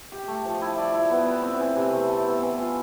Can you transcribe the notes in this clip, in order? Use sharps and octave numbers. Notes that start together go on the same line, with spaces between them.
G4
A3
F3
E4
D5
E4
B3
B4
C4
E3
C3
A3
A4
B3
E3
F4